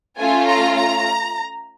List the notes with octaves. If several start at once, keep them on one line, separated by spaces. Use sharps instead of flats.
A3 C#4 F4 G#5
A#5
A#5